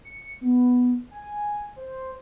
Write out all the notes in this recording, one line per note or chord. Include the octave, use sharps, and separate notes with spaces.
C#7
B3
G#5
C5